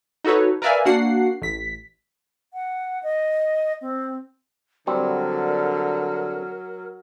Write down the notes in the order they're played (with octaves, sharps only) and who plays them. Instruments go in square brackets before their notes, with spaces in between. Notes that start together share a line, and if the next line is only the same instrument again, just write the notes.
[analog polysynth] D#4 F#4 A4 B4 C#5
A#4 B4 D5 E5 F5 G#5
A#3 D4 F#4 F#5 C7
A1 B6
[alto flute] F#5
D#5
C4
[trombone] D3 [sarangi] F#3 [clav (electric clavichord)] G3 C4 [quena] A#4